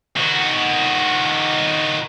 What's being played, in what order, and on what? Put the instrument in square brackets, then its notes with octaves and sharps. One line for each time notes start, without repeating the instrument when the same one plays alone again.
[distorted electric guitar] D#3 F#4